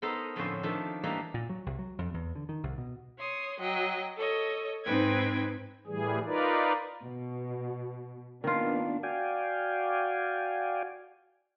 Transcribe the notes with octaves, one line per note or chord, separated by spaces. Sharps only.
B3 D#4 A4 A#4 C5 D#5
F2 A2 D3 F3 C#4 C5
D#3 F3 A3 D4 A4
E3 G3 A3 A#3 D4 D#4
A#2
F#3
C2
F#3
F2
E2
D3
D#3
C2
B2
C#5 C6 D#6
F#3 D#5 G5
A4 C#5 D#5
G#2 C4 D#4 B4 G5 G#6
A2 E3 G3 G#4
D#4 F4 A#4 B4 D5
B2
D#3 A#3 B3 D4 F4
F#4 D5 F5 G5 G#5